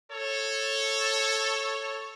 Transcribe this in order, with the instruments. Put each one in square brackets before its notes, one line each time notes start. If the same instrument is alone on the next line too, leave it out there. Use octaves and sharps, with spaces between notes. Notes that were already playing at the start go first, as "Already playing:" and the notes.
[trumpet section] A4 C#5